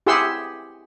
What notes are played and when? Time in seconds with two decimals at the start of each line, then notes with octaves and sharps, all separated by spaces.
0.06 E4 G4 G#4 F#5 C6 E6